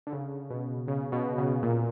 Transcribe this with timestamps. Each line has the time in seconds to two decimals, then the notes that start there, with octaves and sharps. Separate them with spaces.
0.07 D3
0.13 C#3
0.50 B2
0.88 C#3
1.12 B2
1.38 C#3
1.63 A#2